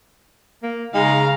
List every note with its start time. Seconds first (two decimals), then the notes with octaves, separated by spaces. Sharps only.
0.63 A#3
0.94 C#3 G#3 D#4 F5 A#5